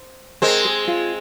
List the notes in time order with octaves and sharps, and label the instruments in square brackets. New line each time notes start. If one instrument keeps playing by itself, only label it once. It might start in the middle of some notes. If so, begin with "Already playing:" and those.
Already playing: [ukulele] C5
[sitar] G#3 C4 [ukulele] A#4
[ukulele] G#4
F4